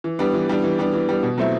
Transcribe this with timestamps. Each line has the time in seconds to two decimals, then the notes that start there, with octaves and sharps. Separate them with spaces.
0.04 E3
0.19 G3 B3 D4
0.34 E3
0.49 G3 B3 D4
0.63 E3
0.79 G3 B3 D4
0.94 E3
1.09 G3 B3 D4
1.23 B2
1.38 F#3 A3 C4 E4